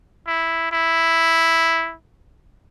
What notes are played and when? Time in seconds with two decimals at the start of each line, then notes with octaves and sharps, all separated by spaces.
0.27 E4
0.72 E4